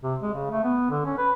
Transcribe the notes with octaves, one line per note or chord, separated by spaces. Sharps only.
C3
G#3
C#3
A3
B3
D3
C#4
B4